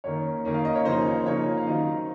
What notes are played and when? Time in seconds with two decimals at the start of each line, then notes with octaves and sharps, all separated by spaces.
0.04 D#3 A#3 C#4 C#5
0.45 D#3 A#3 C#4
0.54 F5
0.65 D#5
0.75 C#5
0.85 C#3 F3 A#3 D#4 C5
1.06 C#5
1.26 C#3 F3 A#3 D#4 C#5
1.57 F5
1.67 D#3 F#3 C4 D#4 D#5